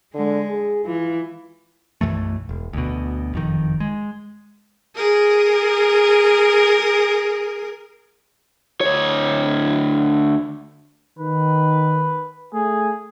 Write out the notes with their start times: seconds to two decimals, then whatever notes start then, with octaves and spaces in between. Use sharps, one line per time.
0.14 D3 G#3
0.48 G#4
0.85 E3 F4
2.01 B1 F#2 E3 A3
2.49 E1
2.73 D2 B2
3.33 F#1 F2 D#3
3.80 G#3
4.96 G#4 A#4
8.81 D2 C#5
11.19 D#3 B4
12.54 A3 G#4